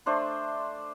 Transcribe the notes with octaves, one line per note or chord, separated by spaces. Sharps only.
A3 D4 C5 C6